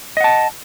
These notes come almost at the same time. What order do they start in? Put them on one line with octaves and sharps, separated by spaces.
D#5 F#5 A5